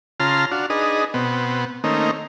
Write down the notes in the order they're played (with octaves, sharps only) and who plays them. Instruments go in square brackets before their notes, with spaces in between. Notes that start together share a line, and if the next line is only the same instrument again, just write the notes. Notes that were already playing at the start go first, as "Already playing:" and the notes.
[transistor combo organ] C#3 F4 A5 A#5 C6 F6
D4 F#4 F5
D4 D#4 G#4 B4 D#5
B2 B3 C4
D#3 A3 A#3 C4 C#4 D#4